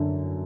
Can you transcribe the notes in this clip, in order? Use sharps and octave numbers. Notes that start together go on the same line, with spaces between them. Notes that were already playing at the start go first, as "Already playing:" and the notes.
Already playing: F#2 D3